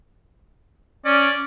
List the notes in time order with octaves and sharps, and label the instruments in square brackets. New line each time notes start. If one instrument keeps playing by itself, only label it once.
[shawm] C#4 [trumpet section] D5